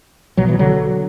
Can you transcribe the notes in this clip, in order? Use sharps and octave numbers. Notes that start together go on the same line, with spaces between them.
B1 B2 F#3
E3
D3 F#3